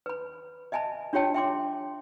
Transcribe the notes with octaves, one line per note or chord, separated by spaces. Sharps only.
B4 B5
D#5 E5 G#5 A5 B5
D4 F4 G4 C#5 G5 A5
E5 G5 C6 D6